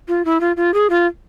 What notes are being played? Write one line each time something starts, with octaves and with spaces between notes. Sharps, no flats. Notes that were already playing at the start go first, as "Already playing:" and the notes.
F4
E4
F4
F4
G#4
F4